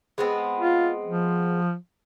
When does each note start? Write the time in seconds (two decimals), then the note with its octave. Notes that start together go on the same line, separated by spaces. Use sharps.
0.18 G#3 B3 C4
0.59 F4
1.05 F3